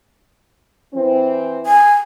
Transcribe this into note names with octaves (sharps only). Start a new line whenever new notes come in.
E3 C4
G#5